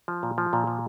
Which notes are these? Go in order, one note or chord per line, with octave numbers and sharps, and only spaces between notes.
F3
A#2
F3
A#2
F3